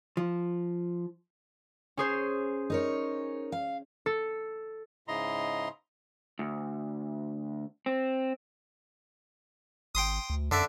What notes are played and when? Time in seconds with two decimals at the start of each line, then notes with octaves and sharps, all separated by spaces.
0.17 F3
1.97 C#4 G#4 C5
2.70 D#4 A#4 C#5
3.52 F5
4.06 A4
5.08 G#2 C#3 E4 D#5 A#5 C6
6.39 D2
7.86 C4
9.95 G#1 G5 C6 D#6
10.30 D2
10.52 F#2 D3 D5 E5